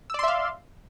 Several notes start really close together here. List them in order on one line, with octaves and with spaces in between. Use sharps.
E6 D5 C6 E5 F5